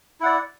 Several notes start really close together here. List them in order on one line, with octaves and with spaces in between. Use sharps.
E4 F#5 D5